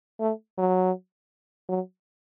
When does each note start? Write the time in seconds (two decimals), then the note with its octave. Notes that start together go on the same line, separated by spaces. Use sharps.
0.20 A3
0.58 F#3
1.69 F#3